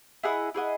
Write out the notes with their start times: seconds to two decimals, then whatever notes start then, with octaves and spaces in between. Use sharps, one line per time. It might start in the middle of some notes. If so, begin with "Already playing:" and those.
0.23 E4 G#4 D#5 F#5
0.54 E4 G#4 D#5 F#5